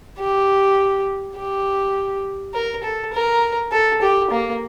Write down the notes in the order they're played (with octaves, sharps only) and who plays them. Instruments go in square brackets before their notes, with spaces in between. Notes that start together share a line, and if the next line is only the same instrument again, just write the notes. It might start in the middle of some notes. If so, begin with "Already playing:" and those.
[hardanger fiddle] G4
G4
A#4
A4
A#4
A4
G4
A#3